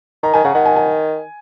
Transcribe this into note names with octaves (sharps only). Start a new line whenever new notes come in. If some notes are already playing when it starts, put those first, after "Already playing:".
D#3 A#5
D#3 G#5
C#3 F#5
D#3 F#5
G#5
G#5